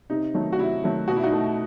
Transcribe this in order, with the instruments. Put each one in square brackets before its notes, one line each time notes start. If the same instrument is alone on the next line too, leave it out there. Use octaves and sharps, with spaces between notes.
[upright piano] C3 D#4
D#3 F#3 A3
F#4
C3 E4
D#3 F#3 A3
B2 F#4
E4
D#4 F#4
A3